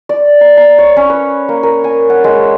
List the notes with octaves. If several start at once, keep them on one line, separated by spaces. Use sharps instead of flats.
D5
A#5
A#5
C#5
C#4
B4
A#3
A#4
G#5
F#5
G#3
E5